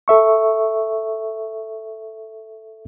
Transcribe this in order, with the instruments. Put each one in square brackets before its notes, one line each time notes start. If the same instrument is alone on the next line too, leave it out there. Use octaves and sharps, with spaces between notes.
[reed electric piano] A4 E5 C#6